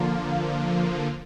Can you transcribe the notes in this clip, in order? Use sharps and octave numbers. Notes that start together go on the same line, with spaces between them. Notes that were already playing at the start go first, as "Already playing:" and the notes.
Already playing: D3 F3 A#3 F4